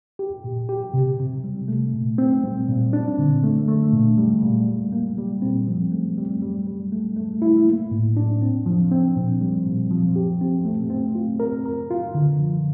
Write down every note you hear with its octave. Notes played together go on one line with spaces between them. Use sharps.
G4
A#2
G4
C3
C3
G3
A3
A#2
C4
G3
A#2
D4
D3
A3
A3
A#2
G3
A#2
G3
A#3
G3
C4
F3
A3
G3
G3
G3
A3
A3
E4
A#3
A2
D4
C4
F3
C4
A#2
G3
A#2
F3
G4
C4
A3
C4
F4
A#4
A#4
F4
D3
F3